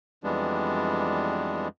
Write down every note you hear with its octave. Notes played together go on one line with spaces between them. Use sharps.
F2 E3 G3 G#3 B3 D4